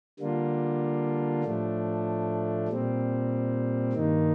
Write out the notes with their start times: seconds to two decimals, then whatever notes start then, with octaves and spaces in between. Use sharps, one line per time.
0.19 D3 G3 A#3 D4 F4
1.44 A2 F3 A3 D4
2.68 A#2 G3 C4
3.93 G2 D#3 A#3 D#4